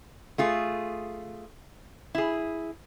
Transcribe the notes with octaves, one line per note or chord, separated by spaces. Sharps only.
A3 F4 G#4
E4 G#4